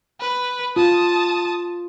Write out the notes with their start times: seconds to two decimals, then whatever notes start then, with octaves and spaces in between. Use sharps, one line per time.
0.20 B4
0.76 F4 A5 D#6